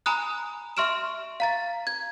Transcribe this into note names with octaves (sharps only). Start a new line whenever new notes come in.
G#5 A#5 B5 D#6 F#6
E5 C6 C#6 F6 D7 E7
F5 A#5 A6
G#6